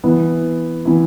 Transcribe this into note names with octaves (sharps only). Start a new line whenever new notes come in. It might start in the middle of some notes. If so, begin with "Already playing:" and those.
E3 B3 E4
E3 B3 E4